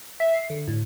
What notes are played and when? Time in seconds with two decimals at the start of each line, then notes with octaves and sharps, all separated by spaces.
0.20 E5
0.34 C7
0.50 D3
0.68 A2